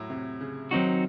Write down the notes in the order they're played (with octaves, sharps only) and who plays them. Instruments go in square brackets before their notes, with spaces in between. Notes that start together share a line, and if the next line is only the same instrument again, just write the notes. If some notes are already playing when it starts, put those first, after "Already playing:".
Already playing: [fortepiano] A2 F#3
C3
C#3
[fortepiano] D#3 [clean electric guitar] F#3 C4 D#4 F#4